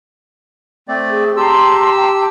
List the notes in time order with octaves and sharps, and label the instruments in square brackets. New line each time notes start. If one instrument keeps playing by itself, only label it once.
[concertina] A3 C4 D5
[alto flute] G#4
[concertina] G4 E6 [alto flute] A5 [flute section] A#5 C6
[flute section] G5